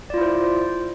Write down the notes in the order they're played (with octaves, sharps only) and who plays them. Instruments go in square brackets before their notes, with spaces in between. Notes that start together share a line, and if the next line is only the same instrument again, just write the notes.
[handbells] D5
F4
E4
C5